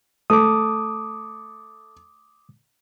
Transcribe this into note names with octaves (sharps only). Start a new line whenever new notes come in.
A3 D6 D#6